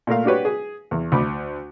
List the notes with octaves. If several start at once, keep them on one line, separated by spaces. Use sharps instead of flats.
A#2 A3 A#4 F5
D4 F#4 G4 B4 C#5
G#4
E2
D2 B5 D6